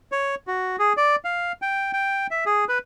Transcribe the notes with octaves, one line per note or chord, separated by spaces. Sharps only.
C#5
F#4
G#4
D5
F5
G5
G5
E5
G#4
B4